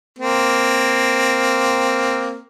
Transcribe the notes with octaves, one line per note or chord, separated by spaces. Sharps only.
A#3 C4